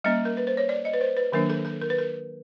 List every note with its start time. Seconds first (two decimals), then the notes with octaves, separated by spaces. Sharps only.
0.04 G3 A#3 C#4 D#5
0.25 A#4
0.37 B4
0.47 C5
0.57 C#5
0.69 D5
0.85 D#5
0.93 B4
1.01 C5
1.17 B4
1.32 D#3 F#3 A#3 D4 A#4
1.50 A4
1.65 A4
1.81 A#4
1.90 B4
1.98 A#4